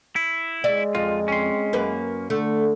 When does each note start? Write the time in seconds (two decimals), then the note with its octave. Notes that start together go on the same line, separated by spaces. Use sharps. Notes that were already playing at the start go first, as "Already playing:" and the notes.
0.16 E4
0.64 G#3 D5 E5
0.95 F2 F4
1.28 C#4 C6
1.73 F#2 A#3 B4
2.30 D3 A3